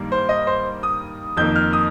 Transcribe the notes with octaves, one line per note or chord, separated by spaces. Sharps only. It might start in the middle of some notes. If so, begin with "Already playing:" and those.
Already playing: G2 D#3 G3 A#3
C5
D#5
C5
D#6
F2 D#3 A#3 G6
F6
D#6